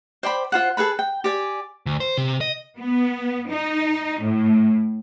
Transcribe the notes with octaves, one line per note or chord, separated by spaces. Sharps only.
C5 D5 G5 B5
F4 C5 F#5
G#4 A4 B4 B5
G5
G4 D5 G#5
D2
C5
C3
D#5
B3
D#4
A2